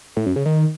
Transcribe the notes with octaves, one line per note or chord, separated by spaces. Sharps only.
A2
F#2
C#3
D#3